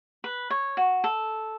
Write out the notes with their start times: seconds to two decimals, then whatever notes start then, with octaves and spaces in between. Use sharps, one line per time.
0.24 B4
0.50 C#5
0.77 F#4
1.04 A4